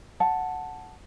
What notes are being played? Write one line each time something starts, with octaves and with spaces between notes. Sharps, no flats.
F#5 A5